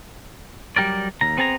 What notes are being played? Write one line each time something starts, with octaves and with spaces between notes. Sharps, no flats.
F#3 G3 G4 A#4 D5
D#2 A#5
B3 C4 G#4 A5 A#5